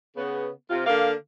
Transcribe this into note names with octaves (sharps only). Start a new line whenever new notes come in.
C#3 B3
C3 F4
D3 A#3 F5